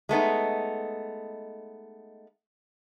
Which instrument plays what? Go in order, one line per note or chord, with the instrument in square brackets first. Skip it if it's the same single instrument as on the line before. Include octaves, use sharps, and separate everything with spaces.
[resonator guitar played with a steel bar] G#3 A3 B3 D#4